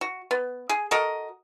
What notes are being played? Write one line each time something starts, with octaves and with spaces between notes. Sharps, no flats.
F#4
B3
G#4
F#4 A4 A#4 D#5